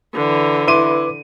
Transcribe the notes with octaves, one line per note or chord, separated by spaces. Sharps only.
D3 E3
E4 B4 C6 D6 D#7